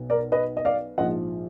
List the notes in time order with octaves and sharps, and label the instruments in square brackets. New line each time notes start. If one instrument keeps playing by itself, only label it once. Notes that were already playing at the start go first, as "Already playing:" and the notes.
Already playing: [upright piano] B1 B2
A#4 D5
B4 D#5
D#5
D5 F5
A#1 G#2 F3 D#5 F#5